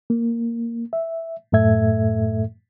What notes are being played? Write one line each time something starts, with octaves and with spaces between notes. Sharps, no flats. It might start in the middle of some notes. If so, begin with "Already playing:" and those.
A#3
E5
F#2 A2 A3 A4 E5 G#6